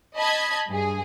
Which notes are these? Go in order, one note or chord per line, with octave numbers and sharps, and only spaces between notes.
D#5 A5 B5 G#6
G2 G#4